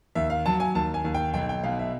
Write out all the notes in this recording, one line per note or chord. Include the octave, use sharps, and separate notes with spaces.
D#2 E5
F5
F#3 A5
G#5
D#2 A5
G#5
D#2
G5
B1 G5
G5
B2 F5
E5